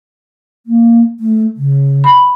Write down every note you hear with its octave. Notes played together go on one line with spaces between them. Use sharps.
A#3
A3
C#3
B5